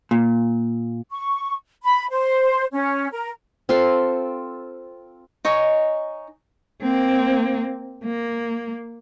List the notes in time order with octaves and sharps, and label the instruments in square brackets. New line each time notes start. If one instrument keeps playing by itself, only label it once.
[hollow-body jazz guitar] A#2
[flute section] C#6
B5
C5
C#4
A#4
[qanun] C4 F4 A4 C6
[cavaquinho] D#4 C#5 D#5 G#5
[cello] A#3 C4
A#3